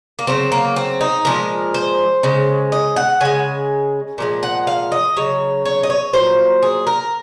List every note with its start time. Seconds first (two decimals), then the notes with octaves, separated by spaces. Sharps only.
0.19 A#3
0.27 C#3 F#3 C4
0.52 A#3
0.76 C4
1.01 D#4
1.25 A#2 F3 G#3 A#4
1.74 C5
2.23 C#3 G#3
2.72 D#5
2.96 F#5
3.20 C#3 G#3 G#5
4.18 A#2 F3 G#3
4.43 F#5
4.67 F5
4.92 D#5
5.16 C#3 F#3 C#5
5.65 C#5
5.83 D#5
5.90 C#5
6.13 A#2 F#3 C5
6.62 G#4
6.87 A#4